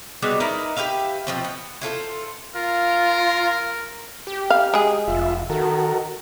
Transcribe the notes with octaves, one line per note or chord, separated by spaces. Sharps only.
G3 G#3 B3 F#4
D#4 E4 A#4 B4
G4 B4 E5 F5
B2 F3 C4
B3
E4 F4 A4 C5
F4 A#4
G4
F5
G#3 G#4
F1 F4 E5
D#3 F#4 A4 A#4